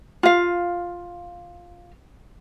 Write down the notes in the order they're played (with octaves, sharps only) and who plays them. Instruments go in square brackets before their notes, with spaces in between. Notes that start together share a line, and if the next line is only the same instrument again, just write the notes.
[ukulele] F4 F5